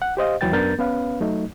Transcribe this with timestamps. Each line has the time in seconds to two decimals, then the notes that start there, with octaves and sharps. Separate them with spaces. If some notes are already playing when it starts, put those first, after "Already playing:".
0.02 F#5
0.17 G4 C5 D#5 F5
0.41 D#2 E3 F#3 B4 G5 A6
0.53 F#2 B3 D4 A#4 G6 A6
0.79 B3 C#4 B4 F5
1.21 F#3 A3 D#4